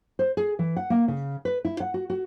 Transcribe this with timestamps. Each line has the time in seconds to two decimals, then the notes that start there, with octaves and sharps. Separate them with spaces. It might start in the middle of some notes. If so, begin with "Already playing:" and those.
0.19 C5
0.37 G#4
0.59 E3
0.77 F#5
0.90 A#3
1.08 C#3
1.45 B4
1.65 E4
1.80 F#5
1.94 F#4
2.10 F#4